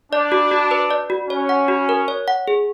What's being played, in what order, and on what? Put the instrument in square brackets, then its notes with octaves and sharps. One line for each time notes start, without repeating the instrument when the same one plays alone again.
[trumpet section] D4 [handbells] D5
[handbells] F#4
F#4
B4
D5
F#4
[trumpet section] C#4 [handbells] C#5
[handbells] F#5
F#4
A#4
C#5
F#5
G#4